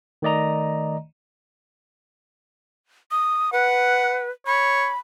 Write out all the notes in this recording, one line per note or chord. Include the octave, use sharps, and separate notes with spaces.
D#3 A3 D5 D#5 A#5
D#6
B4 F#5
C#5 B5